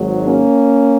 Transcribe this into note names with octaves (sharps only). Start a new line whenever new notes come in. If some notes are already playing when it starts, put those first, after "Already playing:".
Already playing: G#1 G#2 F#3
A#3 C#4